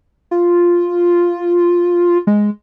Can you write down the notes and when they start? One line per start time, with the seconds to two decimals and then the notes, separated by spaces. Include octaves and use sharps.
0.31 F4
2.27 G#3